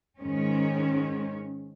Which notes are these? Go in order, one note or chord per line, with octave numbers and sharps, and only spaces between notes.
G#2 D#3 G#3 C#4